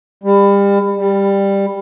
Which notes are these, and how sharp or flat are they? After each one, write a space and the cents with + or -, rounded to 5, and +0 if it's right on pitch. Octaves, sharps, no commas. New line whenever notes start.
G3 +30
G3 +10